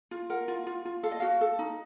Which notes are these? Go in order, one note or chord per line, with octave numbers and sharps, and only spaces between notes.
F4
A#4 F#5
F4
F4
F4
A4 F5
D#5
F#4 F5
A4
D#4